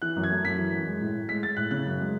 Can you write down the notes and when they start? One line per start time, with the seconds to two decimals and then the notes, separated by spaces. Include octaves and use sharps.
0.02 E3 F#6
0.16 F#2
0.24 G#6
0.30 A3
0.44 F#2 B6
0.58 E3
0.72 F#2
0.86 G#3
1.01 A2
1.15 A2
1.28 G#3 B6
1.43 G#3 A6
1.57 A2 F#6
1.71 C#3 F#6
1.86 F#2
1.99 G#3